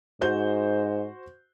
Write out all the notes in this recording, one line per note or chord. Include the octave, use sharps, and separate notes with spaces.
G#2 F#4 C5 G6